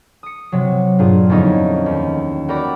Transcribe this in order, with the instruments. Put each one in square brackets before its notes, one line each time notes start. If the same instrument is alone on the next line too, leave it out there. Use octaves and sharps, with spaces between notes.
[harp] D#6 C#7
C3 F#3
G2 A#2 F4 G#4
F2 D3 B3 C#4 D#4 E4
D#2
F#4 G4 A#4 D5 B5 D6